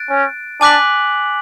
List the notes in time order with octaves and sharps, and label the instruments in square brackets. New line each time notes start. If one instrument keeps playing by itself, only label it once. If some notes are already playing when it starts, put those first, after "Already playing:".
Already playing: [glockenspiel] F#6 A6 D7
[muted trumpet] C#4
[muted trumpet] D4 [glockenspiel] G#5 D6 F#6 B6 F#7